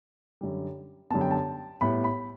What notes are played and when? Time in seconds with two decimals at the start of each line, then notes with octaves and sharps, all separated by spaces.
0.41 F#2 D3 G3
1.11 F#2 D3 G3 B3 A5
1.21 G5
1.31 A5
1.81 A2 G3 B3 B5
2.04 B5